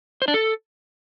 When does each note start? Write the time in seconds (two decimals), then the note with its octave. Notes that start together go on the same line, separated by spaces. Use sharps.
0.22 C5
0.28 D4
0.34 A4